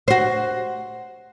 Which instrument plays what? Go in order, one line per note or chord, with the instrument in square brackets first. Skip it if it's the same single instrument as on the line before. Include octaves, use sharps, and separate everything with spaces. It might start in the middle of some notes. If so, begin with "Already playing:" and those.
[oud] F#4 C5